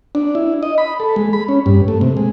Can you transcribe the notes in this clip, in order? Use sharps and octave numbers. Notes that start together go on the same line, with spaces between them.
D4
E4
D#5
B5
A4
G#3
B5
C#4
G2
A3
C3
G#3